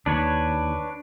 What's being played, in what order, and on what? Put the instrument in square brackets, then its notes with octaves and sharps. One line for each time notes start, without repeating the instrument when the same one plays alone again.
[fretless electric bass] D#2 [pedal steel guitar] D4 B4 C#5